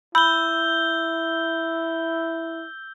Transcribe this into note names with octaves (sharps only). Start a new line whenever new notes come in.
E4 B5 E6 G6 G7